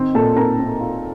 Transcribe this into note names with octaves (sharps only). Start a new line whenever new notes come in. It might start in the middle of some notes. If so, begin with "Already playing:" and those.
Already playing: D#3 C4
A#2 A4 A5
C4 A#4 A#5
C4
F4